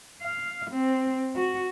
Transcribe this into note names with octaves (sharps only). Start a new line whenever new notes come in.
F5
C4
F#4